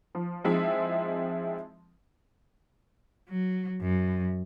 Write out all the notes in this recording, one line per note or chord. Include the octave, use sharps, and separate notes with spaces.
F3
F3 G#3 C4 D#4 E4 E5
F#3
F#2